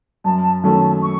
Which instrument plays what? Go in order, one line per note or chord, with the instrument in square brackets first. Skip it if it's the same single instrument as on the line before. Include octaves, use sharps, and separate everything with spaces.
[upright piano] F#2 [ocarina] A5
[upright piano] D#3 F#3 A3 C#4 [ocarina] A5
[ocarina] C#6